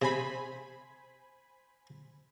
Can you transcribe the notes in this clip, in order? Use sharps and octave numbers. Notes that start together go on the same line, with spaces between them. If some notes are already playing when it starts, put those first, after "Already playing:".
C3 C5 G#5 B5